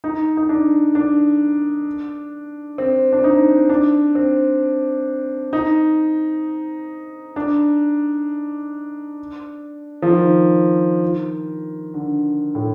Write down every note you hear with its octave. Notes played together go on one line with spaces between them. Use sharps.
D#4
D#4
D4
D4
C4
D4
D#4
D4
C4
D#4
D4
F3
D#3
D3
A2